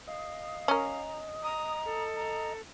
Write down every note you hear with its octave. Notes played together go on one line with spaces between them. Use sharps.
D#5 F5
C#4 A#4 A#5
A#5 D#6
A4
A#5